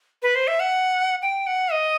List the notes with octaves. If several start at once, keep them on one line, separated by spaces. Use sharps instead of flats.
B4
C5
E5
F#5
G5
F#5
D#5